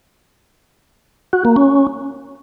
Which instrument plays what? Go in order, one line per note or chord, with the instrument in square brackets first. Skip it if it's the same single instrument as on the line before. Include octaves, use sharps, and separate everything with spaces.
[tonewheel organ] F#4
A#3
C#4